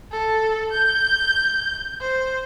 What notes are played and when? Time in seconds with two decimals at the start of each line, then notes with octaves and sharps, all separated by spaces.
0.12 A4
0.72 G6
2.01 C5